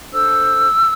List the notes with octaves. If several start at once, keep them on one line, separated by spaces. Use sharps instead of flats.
D4 A4 C5 E6